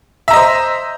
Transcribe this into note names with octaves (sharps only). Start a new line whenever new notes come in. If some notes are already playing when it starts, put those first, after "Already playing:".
C5 D#5 E5 A#5